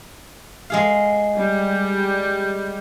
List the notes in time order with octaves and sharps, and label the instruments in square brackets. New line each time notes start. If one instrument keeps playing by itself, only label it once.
[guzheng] G#3 G#4 F5
[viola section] G3